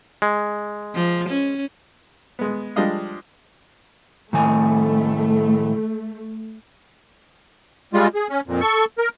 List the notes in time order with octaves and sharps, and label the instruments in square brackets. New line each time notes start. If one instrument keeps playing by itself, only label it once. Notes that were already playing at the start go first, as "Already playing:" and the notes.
[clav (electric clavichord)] G#3
[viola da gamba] F3
C#4
[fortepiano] G#3 B3
F3 G3 G#3 D4 D#5 F5
[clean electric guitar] A2 D#3 G#5 [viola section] A3
[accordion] G3 G#3 F4
G#4
C#4
F2 A#2
A4 C#6
A#4